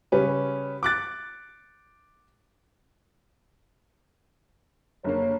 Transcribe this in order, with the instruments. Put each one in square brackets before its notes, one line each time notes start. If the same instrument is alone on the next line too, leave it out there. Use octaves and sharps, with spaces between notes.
[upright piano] C#3 G3 C#4 B4
D6 F#6 A6
[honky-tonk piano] F#1 D3 A#3 [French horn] C#5